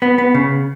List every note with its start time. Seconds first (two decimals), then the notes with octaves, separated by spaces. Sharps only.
0.02 B3
0.18 B3
0.34 C#3